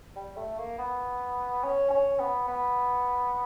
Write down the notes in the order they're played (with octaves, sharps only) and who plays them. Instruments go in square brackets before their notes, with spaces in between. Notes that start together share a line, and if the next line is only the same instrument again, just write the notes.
[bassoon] G3
A3
A#3
B3
C#4
C#4
B3
B3